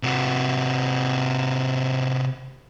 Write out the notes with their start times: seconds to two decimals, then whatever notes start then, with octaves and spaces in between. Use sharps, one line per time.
0.03 C3 F#4